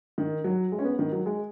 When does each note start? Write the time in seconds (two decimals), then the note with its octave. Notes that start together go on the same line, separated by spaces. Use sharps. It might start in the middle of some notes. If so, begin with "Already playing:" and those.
0.18 D#3
0.44 F#3
0.72 G#3
0.79 C#4
0.84 B3
0.99 D#3
1.12 F#3
1.26 G#3